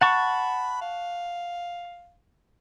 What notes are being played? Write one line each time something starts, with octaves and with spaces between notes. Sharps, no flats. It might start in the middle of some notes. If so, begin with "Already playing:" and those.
F#5 A5 B5 C#6
F5